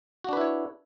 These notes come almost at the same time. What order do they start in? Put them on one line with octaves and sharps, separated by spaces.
F#4 D4 B4 E4 C#5